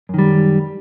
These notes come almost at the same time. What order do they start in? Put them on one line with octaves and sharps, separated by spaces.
F#2 D#3 G3